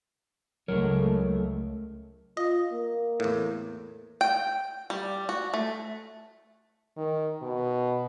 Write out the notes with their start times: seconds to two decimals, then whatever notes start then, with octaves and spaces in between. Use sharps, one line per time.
0.68 C#2 F#3 A3 A#4 C#5
2.37 F4 D#5
2.72 A#3
3.20 E2 A2
4.21 G5
4.90 G3
5.29 F#4
5.54 A3
6.97 D#3
7.42 B2